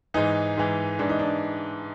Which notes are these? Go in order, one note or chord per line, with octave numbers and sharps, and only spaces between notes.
G#2 E3 D#4
G#2 E3
G#2 E3 D4
D#4
D4